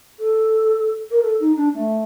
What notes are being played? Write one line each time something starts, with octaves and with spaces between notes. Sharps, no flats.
A4
A#4
A4
D#4
D4
A3